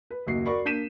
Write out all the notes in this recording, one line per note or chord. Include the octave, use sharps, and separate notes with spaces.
B4
F#1 D#2 F#4 C7
F#4 A#4 D5 B5 C#6
A#3 D4 G6 B6 D#7 E7